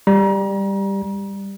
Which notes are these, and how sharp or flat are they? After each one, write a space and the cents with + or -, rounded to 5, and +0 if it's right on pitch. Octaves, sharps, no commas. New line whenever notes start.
G3 +10 A#5 +35